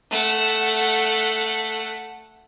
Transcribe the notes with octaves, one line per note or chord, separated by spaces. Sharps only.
A3 F#5